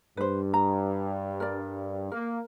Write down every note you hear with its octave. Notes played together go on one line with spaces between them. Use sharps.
G2 B4 C5
A#5
A#4 D5
A#3 A#4